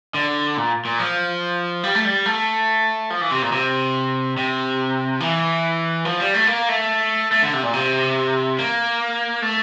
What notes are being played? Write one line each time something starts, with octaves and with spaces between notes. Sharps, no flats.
D3
A#2
A#2
F3
G3
A3
G3
A3
F3
E3
C3
A#2
C3
C3
E3
F3
G3
A3
A#3
A3
A3
D3
C3
A#2
C3
A#3
A3